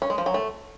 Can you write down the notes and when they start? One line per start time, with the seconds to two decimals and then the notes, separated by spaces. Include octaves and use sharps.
0.02 C#4
0.10 G#3
0.18 F3
0.26 F#3
0.34 A3